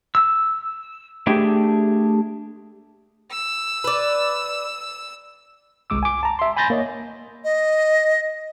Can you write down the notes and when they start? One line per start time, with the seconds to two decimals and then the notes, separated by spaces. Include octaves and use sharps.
0.15 E6
1.27 A3 D4 G4 G#4
3.32 E6
3.84 B4 D5
5.90 G1 C2 G#3 D6 E6
6.03 G#5 D6
6.23 A5 A#5
6.39 E5 C6
6.57 G#5 B5 C6 G6 A6 A#6
6.70 A#3 C#5 D#5
7.44 D#5